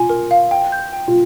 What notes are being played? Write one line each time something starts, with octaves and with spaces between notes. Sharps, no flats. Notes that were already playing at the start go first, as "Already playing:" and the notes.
Already playing: F4 G#5
A#4
F5
G5
G6
G5
F4